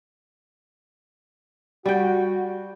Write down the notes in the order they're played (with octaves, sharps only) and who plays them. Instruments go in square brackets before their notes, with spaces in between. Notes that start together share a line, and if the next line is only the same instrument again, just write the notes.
[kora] G3 G5 [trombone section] F#4